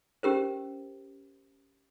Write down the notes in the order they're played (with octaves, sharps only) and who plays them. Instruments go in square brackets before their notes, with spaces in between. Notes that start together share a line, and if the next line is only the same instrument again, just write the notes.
[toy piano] C#4 G4 A#4 C5